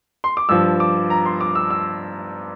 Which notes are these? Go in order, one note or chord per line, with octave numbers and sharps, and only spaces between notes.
C6
D6
G2 F3 E6
D6
A#5
C6
D6
E6
E6